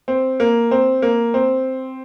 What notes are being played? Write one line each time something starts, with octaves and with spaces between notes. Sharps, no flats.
C4
A#3
C4
A#3
C4